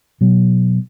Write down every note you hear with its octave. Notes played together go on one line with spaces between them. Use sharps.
B2 F#3